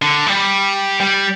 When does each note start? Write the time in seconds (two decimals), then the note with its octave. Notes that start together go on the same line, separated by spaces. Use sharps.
0.02 D3
0.26 G3
1.00 G3